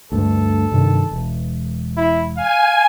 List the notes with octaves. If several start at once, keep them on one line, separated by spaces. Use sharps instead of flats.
D2 G2 A3 A4
G2 C3 D#3
E1
E4
F5 G#5